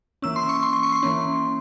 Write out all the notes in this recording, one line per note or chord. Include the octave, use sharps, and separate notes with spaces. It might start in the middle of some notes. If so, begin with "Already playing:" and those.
E3 A#3 C#4 E6
C6
C#6
C6
C6
C#6
C6
E3 A#3 C#4